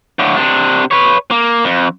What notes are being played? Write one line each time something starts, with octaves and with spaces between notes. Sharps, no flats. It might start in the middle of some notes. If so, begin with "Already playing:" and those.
A2 D3
C3 D4
B4 C#5
A#3
F2